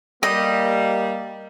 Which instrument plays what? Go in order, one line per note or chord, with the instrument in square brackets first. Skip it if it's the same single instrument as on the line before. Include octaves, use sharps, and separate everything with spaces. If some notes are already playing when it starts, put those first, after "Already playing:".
[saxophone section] G3 [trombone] A#3 [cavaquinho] D#5